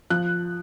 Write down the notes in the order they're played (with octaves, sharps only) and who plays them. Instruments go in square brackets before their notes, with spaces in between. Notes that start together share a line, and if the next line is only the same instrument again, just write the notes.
[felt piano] F3 F#6